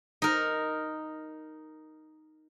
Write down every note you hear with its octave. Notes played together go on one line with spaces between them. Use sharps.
D#4 A#4